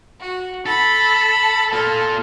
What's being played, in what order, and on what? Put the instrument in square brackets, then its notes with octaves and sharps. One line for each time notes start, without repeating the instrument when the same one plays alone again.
[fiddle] F#4
[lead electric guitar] A4 [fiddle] B5
[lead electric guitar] A#3 F4 [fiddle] A4